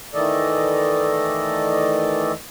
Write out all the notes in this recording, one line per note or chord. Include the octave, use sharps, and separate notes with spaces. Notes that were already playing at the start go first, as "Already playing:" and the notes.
D#3 E3 A3 A4 D5 D#5